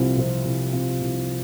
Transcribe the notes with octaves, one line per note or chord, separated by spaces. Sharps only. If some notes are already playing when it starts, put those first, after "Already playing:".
Already playing: C2 C3 F3 C4 F4
C3 F3 C4 F4
C2
C3 F3 C4 F4
C2